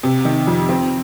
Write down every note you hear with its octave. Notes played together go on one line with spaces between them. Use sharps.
C3
D#3
F2
C4